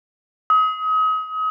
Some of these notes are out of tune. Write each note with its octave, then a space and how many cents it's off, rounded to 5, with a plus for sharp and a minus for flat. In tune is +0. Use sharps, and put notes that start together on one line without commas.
D#6 +35